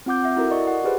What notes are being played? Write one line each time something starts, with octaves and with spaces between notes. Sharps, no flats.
C4 F4 F#5 D6 G6
E5 F#5
E4 F#4 A4 A#4
A#4 D5 D#5 C#6
F#5
F4 G4 G#4 B4 C5